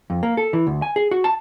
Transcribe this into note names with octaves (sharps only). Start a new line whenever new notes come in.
F2
A#3
A4
E3
D2
G#5
G#4
F#4
A5